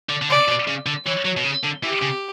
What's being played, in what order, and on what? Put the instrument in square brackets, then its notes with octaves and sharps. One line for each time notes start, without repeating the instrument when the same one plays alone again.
[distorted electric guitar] D3
D3
[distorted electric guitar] C#3 [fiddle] D5
[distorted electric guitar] B2
C#3
D3
[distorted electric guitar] E3 [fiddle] C#5
[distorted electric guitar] F#3
B2
C#3
D3
[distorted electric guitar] E3 [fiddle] G4
[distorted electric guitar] C#3